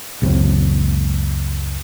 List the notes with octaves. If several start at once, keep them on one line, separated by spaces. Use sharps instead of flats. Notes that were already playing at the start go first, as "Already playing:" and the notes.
C#2 F#2 F#3 C4